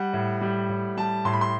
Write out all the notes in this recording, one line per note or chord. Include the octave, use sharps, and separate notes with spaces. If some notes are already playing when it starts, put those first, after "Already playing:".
Already playing: G3 F#5
A2
G3
A2
G3 A5
A2 C6
B5
C6